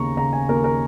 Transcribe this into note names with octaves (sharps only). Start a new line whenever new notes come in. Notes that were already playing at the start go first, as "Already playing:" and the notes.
Already playing: D#2 C#3 A#5 C#6
C#3 A#5
G#5
D#2 A#4
A#4